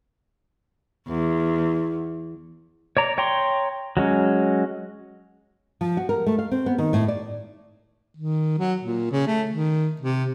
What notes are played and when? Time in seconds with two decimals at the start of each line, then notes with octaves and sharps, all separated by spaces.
1.08 E2
2.97 C#5 D5 A#5
3.18 C#5 G5 A#5 C6
3.97 F#3 G#3 C#4
5.81 F3
5.97 F#4
6.09 A#4
6.26 A3
6.39 F5
6.51 C4
6.66 B3
6.78 D#3
6.93 A2
7.08 D5
8.17 D#3
8.59 F#3
8.82 A#2
9.11 C#3
9.27 A3
9.50 D#3
10.01 C3